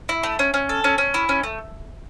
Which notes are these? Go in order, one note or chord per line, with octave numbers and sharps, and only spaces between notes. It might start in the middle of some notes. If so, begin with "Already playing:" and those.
E4
A3
C#4
C#4
A4
C#4
C#4
E4
C#4
A3